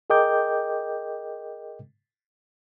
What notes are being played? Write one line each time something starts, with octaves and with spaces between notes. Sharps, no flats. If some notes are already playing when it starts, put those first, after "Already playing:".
G#4 A#4 D#5 G5 D6 G6